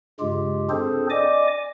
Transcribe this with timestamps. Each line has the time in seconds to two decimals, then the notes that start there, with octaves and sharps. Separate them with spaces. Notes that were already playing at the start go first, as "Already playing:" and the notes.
0.20 G2 C#3 G#3 F4 G4
0.70 C4 D4 G#4 A4 C5
1.10 D5 D#5 G#5 D6